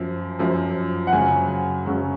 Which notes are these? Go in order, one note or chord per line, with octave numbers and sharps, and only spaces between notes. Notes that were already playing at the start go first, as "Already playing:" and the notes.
Already playing: F#2 F3
F#2 F3
F#5
F#2 C#3 F#3 G#5
F#2 C#3 F#3